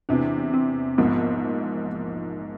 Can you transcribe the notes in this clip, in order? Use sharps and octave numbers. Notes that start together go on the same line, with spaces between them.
E2 C3 E3 D4
C4
A#1 G#2 F3 A#3 B3